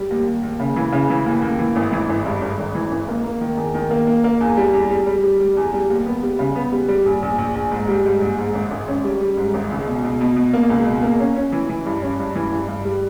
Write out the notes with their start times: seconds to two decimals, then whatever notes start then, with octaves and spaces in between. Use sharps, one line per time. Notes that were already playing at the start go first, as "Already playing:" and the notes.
Already playing: G3
0.10 D#2
0.27 D#2
0.43 D#2
0.60 C#3
0.76 E3
0.93 C#3
1.10 E3
1.26 D#2
1.42 D#2
1.59 E3
1.76 G#1
1.92 E3
2.09 G#1
2.26 G2
2.41 G#1
2.59 G#1
2.75 E3
2.91 G#1
3.09 A#3
3.24 A#3
3.41 D#3
3.57 E2
3.74 D#3
3.91 A#3
4.07 A#3
4.24 A#3
4.41 E2
4.57 G3
4.73 E2
4.90 G3
5.06 G3
5.23 G3
5.40 G3
5.57 E2
5.73 G3
5.90 D#2
6.06 B3
6.23 G3
6.39 C#3
6.56 B3
6.72 G3
6.88 G3
7.05 A#1
7.22 A#1
7.38 A#1
7.55 A#1
7.71 G#2
7.88 G3
8.06 G#2
8.22 A#1
8.39 G#2
8.55 G#1
8.71 G#1
8.88 C#4
9.04 G3
9.21 G3
9.37 G#2
9.54 G#1
9.71 C#2
9.87 B2
10.04 B2
10.21 B2
10.37 B2
10.53 A#3
10.70 C#2
10.86 B2
11.03 A#3
11.20 C#4
11.36 C#4
11.52 E3
11.69 E3
11.86 G2
12.02 C#4
12.19 G2
12.35 E3
12.52 G2
12.68 G2
12.85 G3